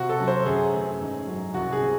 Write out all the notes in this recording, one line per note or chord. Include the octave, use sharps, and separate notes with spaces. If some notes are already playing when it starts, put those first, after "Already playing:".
Already playing: C3 F#4
A4
F#3 C#4
C5
F#2 G#4
E3 A3 C#4
G#2
F#3 C#4
C2 F#4
G#4
C3